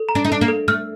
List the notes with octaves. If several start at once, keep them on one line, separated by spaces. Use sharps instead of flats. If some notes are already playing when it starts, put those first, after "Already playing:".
Already playing: A4
A#5
D4
D#4
D4 A4
A#3
A4
A3 F6